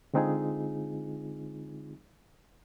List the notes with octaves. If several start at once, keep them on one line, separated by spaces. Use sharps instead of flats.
D3 G#3 C4 D#4 F4 G#4